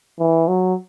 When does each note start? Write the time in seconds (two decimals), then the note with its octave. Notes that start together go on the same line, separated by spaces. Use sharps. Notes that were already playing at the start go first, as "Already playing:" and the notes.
0.19 E3
0.48 F#3